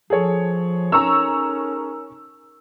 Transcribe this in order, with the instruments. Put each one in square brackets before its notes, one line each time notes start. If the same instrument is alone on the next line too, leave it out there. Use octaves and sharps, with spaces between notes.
[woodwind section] F3 [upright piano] G#4 A4 C#5
[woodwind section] C#4 D#4 A#4 [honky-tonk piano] A#5 C#6 E6